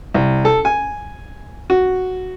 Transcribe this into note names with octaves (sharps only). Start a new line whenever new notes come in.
C2
A4
G#5
F#4